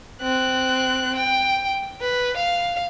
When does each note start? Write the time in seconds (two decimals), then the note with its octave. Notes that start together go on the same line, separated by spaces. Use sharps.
0.22 C4 F#6
1.16 G5
2.01 B4
2.37 F5